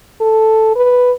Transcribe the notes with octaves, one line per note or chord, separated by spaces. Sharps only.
A4
B4